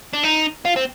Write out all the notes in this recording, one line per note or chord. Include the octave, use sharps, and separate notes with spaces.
D4
D#4
F4
C4